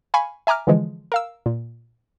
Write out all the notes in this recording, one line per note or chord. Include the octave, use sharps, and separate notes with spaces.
F5 G#5 B5 C#6
E5 G#5 A#5 D6 F6
D3 E3 F3 G#3
A#4 F5 E6
A#2